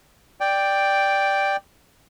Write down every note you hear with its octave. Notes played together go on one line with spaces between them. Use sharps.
D5 G5